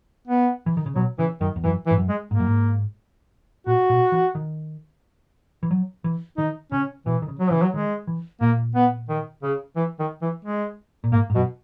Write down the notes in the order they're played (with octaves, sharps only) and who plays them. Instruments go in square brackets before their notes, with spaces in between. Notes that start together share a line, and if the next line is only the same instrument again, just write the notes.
[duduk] B3
[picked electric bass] E3
D#3
C#3
[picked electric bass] B2 [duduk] F#3
[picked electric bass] C#3 [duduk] E3
[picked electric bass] F#2 [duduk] D#3
[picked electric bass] E2
[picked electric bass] F#2 [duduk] E3
[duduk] E3
[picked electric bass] G#2
F#2
[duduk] G#3
[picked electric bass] G#2 [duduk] A#3
[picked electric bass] F#2
G#2
[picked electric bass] A#2 [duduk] F#4
[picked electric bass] B2
E3
D#3
E3
F#3
E3
[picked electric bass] D#3 [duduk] D#4
[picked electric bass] C#3 [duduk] C#4
[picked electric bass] B2 [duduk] E3
[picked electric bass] D#3
C#3
[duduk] F#3
[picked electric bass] C#3 [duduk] E3
[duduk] F#3
[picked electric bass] D#3 [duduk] G#3
[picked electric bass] E3
[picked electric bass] A#2 [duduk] A#3
[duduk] B3
D#3
C#3
E3
D#3
E3
G#3
[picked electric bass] A#2
[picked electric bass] G#2 [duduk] A#3
[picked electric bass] G#2
[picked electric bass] F#2 [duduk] B2